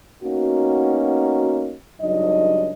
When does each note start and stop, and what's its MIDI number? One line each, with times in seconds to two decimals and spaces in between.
0.22 1.73 58
0.22 1.73 59
0.22 1.73 61
0.22 1.73 63
0.22 1.73 66
2.01 2.73 37
2.01 2.73 43
2.01 2.73 54
2.01 2.73 62
2.01 2.73 63
2.01 2.73 75